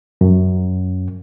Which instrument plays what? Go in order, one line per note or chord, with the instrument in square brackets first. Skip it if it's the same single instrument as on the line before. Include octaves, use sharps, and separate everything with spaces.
[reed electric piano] F#2